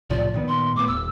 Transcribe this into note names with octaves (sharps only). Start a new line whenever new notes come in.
C2 A2 F3 D5
A#2 D#3 B3
C6
A2 B3 D6
D#1 E6